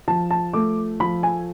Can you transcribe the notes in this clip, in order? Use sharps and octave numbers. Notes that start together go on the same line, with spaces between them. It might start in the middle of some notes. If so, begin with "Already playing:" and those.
F3 A5
A5
A3 D6
F3 B5
G#5